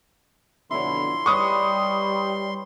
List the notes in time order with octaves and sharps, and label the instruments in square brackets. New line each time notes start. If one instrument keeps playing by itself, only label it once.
[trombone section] F2 B2 D3 [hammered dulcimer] E4 C#5 [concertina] C6
[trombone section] G3 [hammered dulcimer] B4 C#5 D#5 [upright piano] C#6 D#6